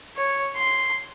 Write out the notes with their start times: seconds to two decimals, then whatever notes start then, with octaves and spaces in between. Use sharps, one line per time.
0.16 C#5
0.56 C6